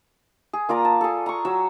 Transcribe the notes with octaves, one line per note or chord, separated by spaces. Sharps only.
G#4
A#3 F4 D5 A#5
A5
G#4 A4
A#5 C#6
F#3 E6